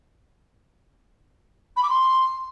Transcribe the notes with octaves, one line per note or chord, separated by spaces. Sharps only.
B5
D6
C6